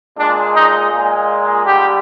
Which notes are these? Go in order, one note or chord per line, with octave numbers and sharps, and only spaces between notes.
A#2 G#3 D4
D#4
A#2 G#3
D3 G3 G4